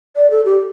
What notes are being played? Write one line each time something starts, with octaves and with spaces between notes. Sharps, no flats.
D5
A4
G4